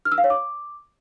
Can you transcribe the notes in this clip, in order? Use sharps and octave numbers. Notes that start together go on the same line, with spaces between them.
F6
E6
F5
C#5
D6